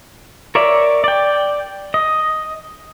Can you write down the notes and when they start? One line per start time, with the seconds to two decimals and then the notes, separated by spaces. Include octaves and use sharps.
0.55 A#4 C#5 D5 E5
1.04 D5 G5
1.94 D#5